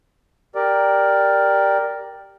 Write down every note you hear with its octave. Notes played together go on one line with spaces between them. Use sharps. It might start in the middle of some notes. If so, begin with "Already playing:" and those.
G4 A#4 D5